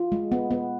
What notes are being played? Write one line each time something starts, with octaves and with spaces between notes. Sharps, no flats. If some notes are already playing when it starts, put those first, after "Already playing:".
Already playing: F4
G#3
B3
B3